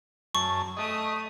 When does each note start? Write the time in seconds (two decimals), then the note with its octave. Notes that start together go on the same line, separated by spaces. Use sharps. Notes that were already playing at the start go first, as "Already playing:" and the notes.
0.35 F#2 A5 C#6
0.77 A3 D#5 D#6